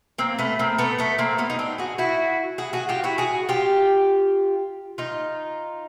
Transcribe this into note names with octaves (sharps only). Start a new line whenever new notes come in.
A#3 C4
A3 B3
A#3 C4
A3 B3
A3 B3
A#3 C4
B3 C#4
D#4
C4 D4
F#4 G#4
E4 F#4
F#4 G#4
F#4 G#4
F4 G4
E4 F#4
F#4 G#4
F4 G4
D#4 F4